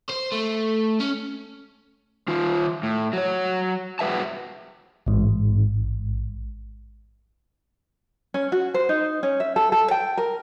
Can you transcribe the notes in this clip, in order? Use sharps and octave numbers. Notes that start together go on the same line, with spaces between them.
C5
A3
C#4
D#3 F4
A2
F#3 C#5
F#2 F#4 B4 E5 A5
A1 G#2
C#4
F#4
C5
D#4
C#4
E5
A4
A4
G5
A#4